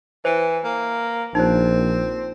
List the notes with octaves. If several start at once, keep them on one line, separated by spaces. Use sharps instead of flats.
E3 C5
A#3
A#1 C4 D#4 C5